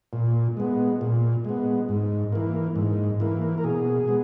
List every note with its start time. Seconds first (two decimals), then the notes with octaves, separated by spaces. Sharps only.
0.13 A#2
0.57 G#3 B3
1.01 A#2
1.45 G#3 B3
1.89 G#2
2.33 E3 A#3
2.76 G#2
3.20 E3 A#3
3.58 A#4
3.64 B2 G#4
4.08 G#3 B3